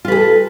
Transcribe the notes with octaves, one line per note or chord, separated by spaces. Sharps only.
F4 G#4 A4 B4